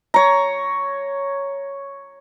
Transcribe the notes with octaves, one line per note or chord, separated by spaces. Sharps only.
C#5 A#5